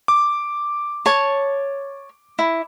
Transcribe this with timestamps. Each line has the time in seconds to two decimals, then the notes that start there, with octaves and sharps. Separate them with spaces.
0.08 D6
1.06 C#5 A5
2.39 E4